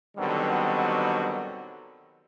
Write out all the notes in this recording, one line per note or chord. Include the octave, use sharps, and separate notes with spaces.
B2 D3 D#3 F#3 G3 C4